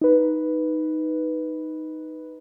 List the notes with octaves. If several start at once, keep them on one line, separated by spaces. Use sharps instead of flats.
D#4 B4